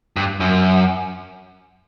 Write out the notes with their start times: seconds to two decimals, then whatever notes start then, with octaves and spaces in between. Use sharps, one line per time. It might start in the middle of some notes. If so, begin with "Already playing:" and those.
0.16 G2
0.40 F#2